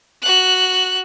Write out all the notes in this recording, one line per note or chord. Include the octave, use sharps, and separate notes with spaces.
F#4 F#6